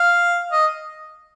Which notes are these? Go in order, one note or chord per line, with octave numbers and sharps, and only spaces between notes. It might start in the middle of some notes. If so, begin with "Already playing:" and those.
Already playing: F5
D#5